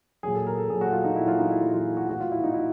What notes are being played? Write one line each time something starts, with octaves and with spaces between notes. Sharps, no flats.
A#2 F#3 G#4
A4
A#4
A4
A#2 F#3 G#4
F#4
F4
D#4
A#2 F#3 E4
F4
D#4
E4
A#2 F#3 E4
F4
F#4
A2 E3 F#4
F4
E4
D#4
E3 E4